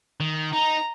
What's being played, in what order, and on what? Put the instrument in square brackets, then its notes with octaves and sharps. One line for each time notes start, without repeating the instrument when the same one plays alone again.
[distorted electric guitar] D#3
[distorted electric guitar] D#4 [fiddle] A#5